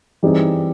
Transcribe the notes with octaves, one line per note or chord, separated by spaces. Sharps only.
E3 G3 C4 D#4 G#4